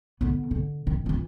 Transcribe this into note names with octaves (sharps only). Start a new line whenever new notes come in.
D3 B3
D3
D#3
E3 F4